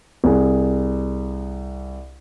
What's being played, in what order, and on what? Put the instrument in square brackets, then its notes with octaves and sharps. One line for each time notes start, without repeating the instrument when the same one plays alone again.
[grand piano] C2 G#4